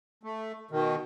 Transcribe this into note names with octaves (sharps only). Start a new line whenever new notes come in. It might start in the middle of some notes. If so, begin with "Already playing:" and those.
A3
B2 D#3